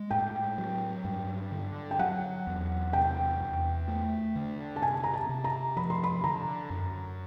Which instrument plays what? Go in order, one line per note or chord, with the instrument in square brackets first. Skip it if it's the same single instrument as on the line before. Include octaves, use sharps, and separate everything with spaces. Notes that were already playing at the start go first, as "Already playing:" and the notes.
Already playing: [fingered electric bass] G#3
[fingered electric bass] A2 [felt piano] G5
[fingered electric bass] F#3
G2
D3
[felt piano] G5
[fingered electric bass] F#3 [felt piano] F#5
[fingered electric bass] E2
[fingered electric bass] C3 [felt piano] G5
[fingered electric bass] E2
A3
D3
[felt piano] A5
[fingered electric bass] C3 [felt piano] G#5
[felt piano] A#5
A5
[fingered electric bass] C3
[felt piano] A#5
[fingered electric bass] F3 [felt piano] B5
[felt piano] C6
B5
[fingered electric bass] D3 [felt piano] A#5
[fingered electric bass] F#2